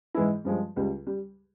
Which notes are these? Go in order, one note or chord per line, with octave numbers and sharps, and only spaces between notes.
G#2 E3 G#3 E4
G2 F3 G#3
C#2 C#3 G3
G3